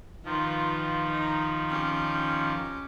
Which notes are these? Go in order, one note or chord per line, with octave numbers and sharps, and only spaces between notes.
D#3 F3 F4 B4
D#4
C#4 G4